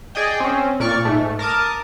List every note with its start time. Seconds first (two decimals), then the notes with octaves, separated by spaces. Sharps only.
0.15 G#4 D5 D#5 G5
0.40 C4 C#4
0.80 A#2 D5 C#6 F6
1.05 G#2 A3
1.39 A#4 A5 D6 D#6